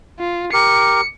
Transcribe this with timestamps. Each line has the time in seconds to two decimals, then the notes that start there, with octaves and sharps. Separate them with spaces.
0.19 F4
0.53 G4 A#4 C#7